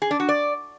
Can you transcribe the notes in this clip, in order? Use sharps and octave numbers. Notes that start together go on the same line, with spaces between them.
G#4
D4
F#4
D5